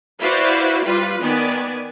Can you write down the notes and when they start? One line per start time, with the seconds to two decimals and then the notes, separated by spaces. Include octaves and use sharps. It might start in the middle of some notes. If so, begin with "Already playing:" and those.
0.20 E4 F#4 B4 C5 D5 F5
0.84 G3 F4 B4
1.21 D#3 B3 D5 G#5